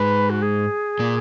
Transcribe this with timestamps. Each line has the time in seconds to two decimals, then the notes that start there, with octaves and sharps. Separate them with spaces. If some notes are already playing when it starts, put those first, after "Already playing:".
Already playing: G#2 G#3 B4
0.30 F#4
0.42 G#4
0.99 A#2 A#3